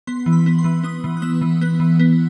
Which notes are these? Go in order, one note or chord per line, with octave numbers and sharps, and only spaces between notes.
B3 C6
E3
B5
B3
C6
E3
B3 D#6
E3
F#6
B3 E6
E3
B3 F#6
E3
B3